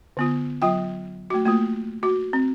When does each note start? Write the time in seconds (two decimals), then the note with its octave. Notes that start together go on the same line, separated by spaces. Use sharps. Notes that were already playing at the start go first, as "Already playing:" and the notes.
0.17 D3 B3 F4
0.62 F#3 F4 G5
1.30 A3 F#4
1.46 A3 A#3 F4
2.03 F#4
2.33 C4